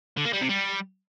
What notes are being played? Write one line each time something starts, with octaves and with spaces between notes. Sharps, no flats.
D3
A#3
G3
C3
G3